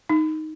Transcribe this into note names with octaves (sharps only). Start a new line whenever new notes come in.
D#4